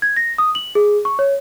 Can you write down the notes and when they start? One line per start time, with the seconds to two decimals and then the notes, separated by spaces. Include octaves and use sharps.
0.02 G#6
0.16 A#6
0.38 D#6
0.55 F#7
0.75 G#4
1.05 C#6
1.19 C#5